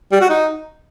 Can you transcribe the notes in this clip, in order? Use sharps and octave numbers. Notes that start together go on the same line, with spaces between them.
G3
F#4
D#4